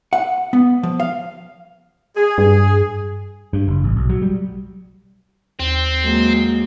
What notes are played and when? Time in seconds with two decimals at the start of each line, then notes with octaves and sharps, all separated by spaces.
0.13 F#5
0.53 B3
0.83 F3
1.00 F5
2.16 G#4
2.38 G2
3.53 G2
3.68 F#1
3.84 A1
3.96 B1
4.10 F#3
4.22 G3
5.60 D#2 C4
6.02 F#3 G#3 A#3